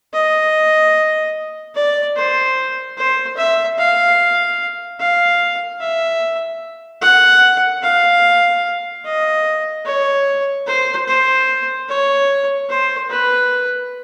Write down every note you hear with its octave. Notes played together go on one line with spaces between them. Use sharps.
D#5
D5
C5
C5
E5
F5
F5
E5
F#5
F5
D#5
C#5
C5
C5
C#5
C5
B4